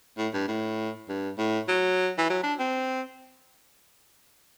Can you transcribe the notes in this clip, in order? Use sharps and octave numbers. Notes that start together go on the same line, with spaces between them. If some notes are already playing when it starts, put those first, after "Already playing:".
A2
G2
A2
G2
A2
F#3
E3
F#3
D4
C4